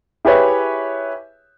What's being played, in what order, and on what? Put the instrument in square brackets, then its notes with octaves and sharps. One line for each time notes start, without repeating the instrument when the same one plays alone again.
[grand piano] E4 G4 G#4 B4 C#5 E5